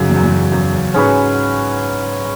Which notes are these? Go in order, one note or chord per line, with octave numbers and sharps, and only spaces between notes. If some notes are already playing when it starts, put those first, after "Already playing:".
Already playing: F#2 C#3 D#4 F#4
E2
F#2
E2
F#2
F#2
F#2
G#2 C#4 G#4 B4